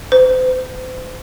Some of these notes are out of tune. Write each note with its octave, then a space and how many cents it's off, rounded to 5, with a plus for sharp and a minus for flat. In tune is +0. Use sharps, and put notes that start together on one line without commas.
C5 -40